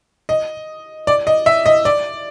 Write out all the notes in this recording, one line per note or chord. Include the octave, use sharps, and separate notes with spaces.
D#5
D5
D#5
E5
D#5
D5